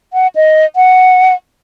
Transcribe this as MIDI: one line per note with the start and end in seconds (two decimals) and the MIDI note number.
0.13 0.27 78
0.35 0.66 75
0.76 1.34 78